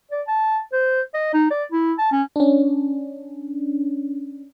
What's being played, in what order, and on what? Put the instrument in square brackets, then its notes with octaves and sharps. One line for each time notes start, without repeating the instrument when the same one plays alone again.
[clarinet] D5
A5
C5
D#5
D#4
D5
E4
A5
C#4
[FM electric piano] C#4 D4